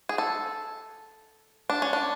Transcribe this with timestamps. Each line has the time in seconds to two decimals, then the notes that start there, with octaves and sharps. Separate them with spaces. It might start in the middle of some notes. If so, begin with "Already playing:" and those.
0.09 G#4
0.18 A4
1.70 D4
1.82 C#4
1.93 D4